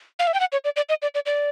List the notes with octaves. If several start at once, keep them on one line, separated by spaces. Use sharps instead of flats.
F5
E5
G5
F#5
C#5
D5
D5
D#5
D5
D5
D5